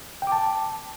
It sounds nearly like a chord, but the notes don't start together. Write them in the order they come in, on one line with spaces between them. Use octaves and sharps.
G5 D6 A5